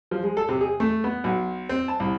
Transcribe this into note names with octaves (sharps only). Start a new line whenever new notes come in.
F3
G#3
A4
C3
G#4
A3
B3
B1
C4
A5
C2